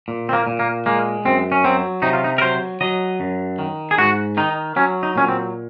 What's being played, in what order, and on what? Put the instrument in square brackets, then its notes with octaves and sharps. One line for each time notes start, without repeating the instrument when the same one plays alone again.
[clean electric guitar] A#2
C4
A#3
A#2
A#3
G#3 A#3
F#2 C4
C#4
F#3 C4
C3 D#4
F4
D#4
A#4
F#3 C5
F#3 D#5
F#2
D#3
G#4
G#2 F#4
D#3 D#4
F#3 C#4
D#4
A#2 C#4
C4